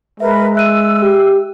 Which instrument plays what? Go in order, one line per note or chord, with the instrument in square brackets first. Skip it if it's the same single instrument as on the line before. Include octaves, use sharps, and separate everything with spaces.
[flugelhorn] G#3 [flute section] A#4 B4 [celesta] E5
[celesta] E5 F#6 D#7 [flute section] E6
[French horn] G4